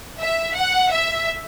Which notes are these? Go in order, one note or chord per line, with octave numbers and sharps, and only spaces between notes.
E5
F#5
E5